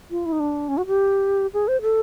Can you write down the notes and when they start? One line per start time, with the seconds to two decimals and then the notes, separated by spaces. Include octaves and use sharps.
0.11 F4
0.26 E4
0.32 D#4
0.40 D4
0.69 C#4
0.78 F#4
0.87 G4
1.54 G#4
1.68 C5
1.82 A4